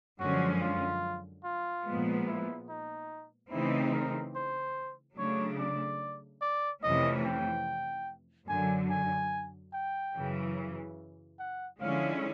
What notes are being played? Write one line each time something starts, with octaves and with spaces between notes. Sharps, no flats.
F#2 D3 F3 G#3 C#4 F#4
F4
F4
A#2 F3 G#3 B3
E4
D#4
C#3 E3 A3 C4 D#4 E4
A#4
C5
C#3 F#3 A3 D4 C#5
D5
D5
F2 C3 E3 A3 C#4 D#5
G5
F#2 D3 F#3 G#5
G#5
G5
F#2 C#3 E3
F#5
D3 F3 G#3 C#4 E4 F5